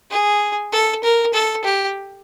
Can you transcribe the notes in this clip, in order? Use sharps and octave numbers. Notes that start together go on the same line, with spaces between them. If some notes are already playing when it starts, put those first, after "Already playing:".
G#4
A4
A#4
A4
G4